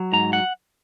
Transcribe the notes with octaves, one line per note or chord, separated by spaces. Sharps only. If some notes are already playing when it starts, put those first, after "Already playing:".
Already playing: F#3
G#2 A#5
F#5